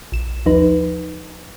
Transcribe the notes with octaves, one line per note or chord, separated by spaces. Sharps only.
A#1 E7
D#2 F3 D#4 B4